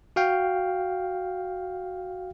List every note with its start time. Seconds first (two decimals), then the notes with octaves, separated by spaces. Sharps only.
0.16 F#4 F5 G5